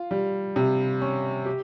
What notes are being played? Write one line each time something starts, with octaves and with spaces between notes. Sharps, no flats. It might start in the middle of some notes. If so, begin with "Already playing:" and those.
Already playing: F4
G3
C3
C#4
G4